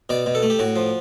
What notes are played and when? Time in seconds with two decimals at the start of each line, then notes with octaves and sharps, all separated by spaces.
0.09 B2 D5
0.26 B2
0.35 A4
0.43 A3
0.50 G4
0.59 A2 F#4
0.76 F3